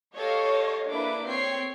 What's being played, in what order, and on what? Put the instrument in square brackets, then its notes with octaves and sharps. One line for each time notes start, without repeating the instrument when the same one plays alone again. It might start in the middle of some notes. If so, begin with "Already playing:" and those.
[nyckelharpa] G4 A4 [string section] C#5 D#5 F5
[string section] A#3 D4 E4 [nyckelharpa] B4 D6
[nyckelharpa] C4 C#5 [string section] G5 C7